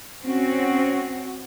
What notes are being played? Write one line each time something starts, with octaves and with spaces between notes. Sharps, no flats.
C4 C#4 F#4